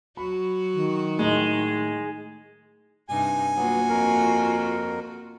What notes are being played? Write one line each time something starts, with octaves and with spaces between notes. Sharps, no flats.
F#3 F#4 B5
D#3
A2 G#3 D#4
G2 C3 D#4 G#5
F#3 A#3 B3 F4 F#4
F2 A#4